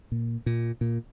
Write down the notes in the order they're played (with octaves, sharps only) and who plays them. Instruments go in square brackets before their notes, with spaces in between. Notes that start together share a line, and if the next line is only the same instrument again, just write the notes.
[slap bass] A#2
A#2
A#2